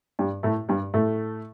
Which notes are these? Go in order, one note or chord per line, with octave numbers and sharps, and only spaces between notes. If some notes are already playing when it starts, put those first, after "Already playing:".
G2 G3
A2 A3
G2 G3
A2 A3